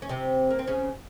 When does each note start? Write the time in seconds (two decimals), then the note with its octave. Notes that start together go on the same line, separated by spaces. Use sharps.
0.02 C#4
0.09 C3 C4
0.51 A#3
0.59 C4
0.67 C#3 C#4